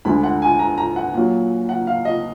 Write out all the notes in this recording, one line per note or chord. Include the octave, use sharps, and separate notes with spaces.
D2 D3 G#3 B5
F#5
G#5
A#5
A#5
F#5
A#2 F#3
F#5
F5
D#5